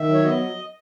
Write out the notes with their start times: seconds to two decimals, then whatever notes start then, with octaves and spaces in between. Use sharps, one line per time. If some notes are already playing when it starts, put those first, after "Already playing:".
Already playing: D#3 E5
0.09 F#3
0.14 C#5
0.25 B3 D#5